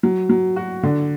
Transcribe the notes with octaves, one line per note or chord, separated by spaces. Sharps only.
F#3
F#3
F#4
D3